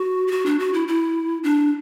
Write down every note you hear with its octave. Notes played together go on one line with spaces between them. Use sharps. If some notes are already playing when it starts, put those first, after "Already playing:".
Already playing: F#4
G4
F#4
D4
F#4
E4
E4
D4